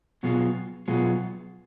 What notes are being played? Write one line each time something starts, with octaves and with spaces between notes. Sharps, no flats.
B2 F#3 B3 F4 G#4
B2 F#3 B3 F4 G#4